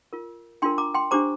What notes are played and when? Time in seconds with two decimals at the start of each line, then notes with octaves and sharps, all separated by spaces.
0.13 F4 A#4
0.62 D4 F4 A#4 G5 C6
0.78 A#5 D6
0.95 G5 C6
1.11 D4 G4 C5 A#5 D6